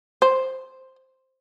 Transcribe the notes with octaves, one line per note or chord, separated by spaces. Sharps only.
C5